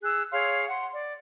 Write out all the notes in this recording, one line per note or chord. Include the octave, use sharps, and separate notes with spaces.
G#4 E6 F#6
G#4 C#5 F5 C6
F#5 C6
D5